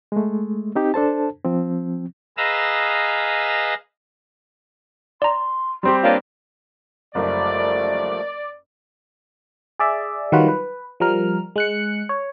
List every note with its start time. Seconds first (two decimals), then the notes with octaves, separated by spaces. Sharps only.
0.12 G#3 A3
0.75 C4 D#4 G4
0.94 D4 A4 C5 A5
1.44 F3 C4
2.37 G#4 B4 D#5 F5 A#5 E6
5.22 D5 A#5 C6
5.83 G3 C4 G4 C6
6.03 A#3 D4 F4 C#5
7.15 F#1 F3 G3 A3 D5
9.79 G#4 D5 E5
10.32 D#3 F#3 G3 F4 F#4 B4
10.48 B4
11.00 F3 G3 A#4 F6
11.56 G#3 F#6 C#7
12.09 C#5